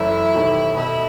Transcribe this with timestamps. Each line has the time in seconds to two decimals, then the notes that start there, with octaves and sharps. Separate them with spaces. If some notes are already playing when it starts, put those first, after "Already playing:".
Already playing: F#1 F#2 E3 A3 E4
0.34 E1 D#2 D#3 A3 D#4
0.76 B2 A3 D#4 E4 A4